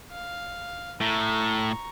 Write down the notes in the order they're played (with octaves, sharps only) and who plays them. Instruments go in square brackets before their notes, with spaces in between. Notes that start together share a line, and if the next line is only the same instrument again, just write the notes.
[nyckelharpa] F5
[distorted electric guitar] A2 [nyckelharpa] A#5 C#6